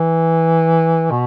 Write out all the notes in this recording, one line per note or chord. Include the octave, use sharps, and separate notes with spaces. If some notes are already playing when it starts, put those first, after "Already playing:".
Already playing: E3
B2